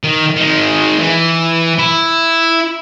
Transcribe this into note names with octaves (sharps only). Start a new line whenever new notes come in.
D#3
D#3 G#3
E3
E4